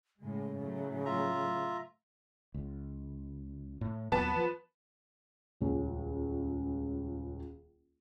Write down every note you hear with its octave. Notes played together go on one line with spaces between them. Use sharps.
A2 C#3 G#3
A2 F#3 A3
F4 E5 A#5
C#2
A2
D#2 A#2 F#3 B3 A5
F3
D#1 C#2 C#4